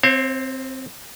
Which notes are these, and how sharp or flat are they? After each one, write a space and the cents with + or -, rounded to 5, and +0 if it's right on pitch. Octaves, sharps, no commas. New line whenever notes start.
C4 +0 C#5 -45 F5 +0